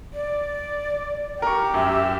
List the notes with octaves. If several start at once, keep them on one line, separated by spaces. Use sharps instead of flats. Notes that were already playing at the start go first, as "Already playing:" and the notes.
D5
G4 A#4 C#6
F#2 E5